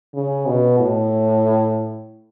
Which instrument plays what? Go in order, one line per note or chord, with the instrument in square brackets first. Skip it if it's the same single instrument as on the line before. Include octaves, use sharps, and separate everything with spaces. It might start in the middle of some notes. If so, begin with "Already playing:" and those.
[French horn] C#3
B2
A2